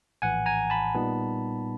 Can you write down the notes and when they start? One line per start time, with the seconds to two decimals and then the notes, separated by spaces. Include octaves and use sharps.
0.22 A#1 A2 E3 F#5 G#5
0.46 G#5 A#5
0.70 A5 B5
0.95 A#2 G3 B3 D#4